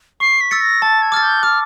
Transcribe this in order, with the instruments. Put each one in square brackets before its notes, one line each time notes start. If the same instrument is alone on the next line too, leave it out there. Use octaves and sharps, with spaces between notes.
[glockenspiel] C#6 [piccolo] C7
[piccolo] B6
[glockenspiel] E6 A6 C#7
[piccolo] A#6
[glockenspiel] A5 [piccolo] A6
[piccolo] G#6
[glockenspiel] D6 F6 A6
[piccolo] G6
[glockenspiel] D6 [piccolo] F6